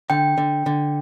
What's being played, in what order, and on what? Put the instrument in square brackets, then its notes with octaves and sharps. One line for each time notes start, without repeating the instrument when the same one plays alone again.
[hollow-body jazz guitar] D3 [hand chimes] G5
[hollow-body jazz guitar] D3
D3